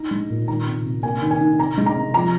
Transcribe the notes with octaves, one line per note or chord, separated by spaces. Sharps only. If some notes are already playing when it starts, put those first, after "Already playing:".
Already playing: D#4 A#5
G#3
A#2
D#3 A#5
C3
C3
A#3 G#5
D#3
G#5
D#4
C3 A#5
G#3
A#5
C3
F3 A#5